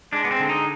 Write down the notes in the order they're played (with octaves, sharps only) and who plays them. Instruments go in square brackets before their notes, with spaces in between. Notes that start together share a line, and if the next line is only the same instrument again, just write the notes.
[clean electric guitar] G#3 D4
B3
C4
D3
D#4